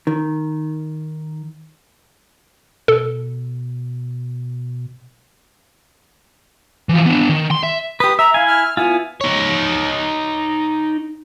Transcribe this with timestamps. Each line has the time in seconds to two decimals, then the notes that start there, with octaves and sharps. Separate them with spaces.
0.07 D#3
2.88 B2 A4
6.89 E3 F3
7.06 B3 D4
7.29 D#3
7.51 C6
7.63 E5
8.00 G4 B4 D#6
8.19 E5 A#5
8.34 E4 F5 G#5
8.47 F6
8.77 B3 E4 F4 G#5
9.21 D#4 C#5